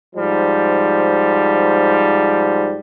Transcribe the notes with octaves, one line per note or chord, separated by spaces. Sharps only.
G#2 F3 G3